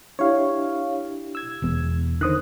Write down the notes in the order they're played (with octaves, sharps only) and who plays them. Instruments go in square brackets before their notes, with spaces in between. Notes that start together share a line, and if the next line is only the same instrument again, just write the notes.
[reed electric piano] D4 E4 G4 [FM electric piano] C#5 F5
[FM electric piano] E6 G#6
[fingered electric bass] E1 E2 B3
[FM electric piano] D3 D#3 [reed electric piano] C5 D#6 F#6